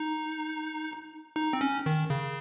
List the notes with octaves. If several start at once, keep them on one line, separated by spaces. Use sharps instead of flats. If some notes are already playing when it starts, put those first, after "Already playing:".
Already playing: D#4
D#4
C4
C#4
D#3
C#3